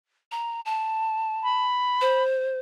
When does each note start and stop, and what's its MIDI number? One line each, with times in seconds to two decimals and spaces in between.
0.32 0.61 82
0.66 1.65 81
1.43 2.23 83
2.01 2.60 72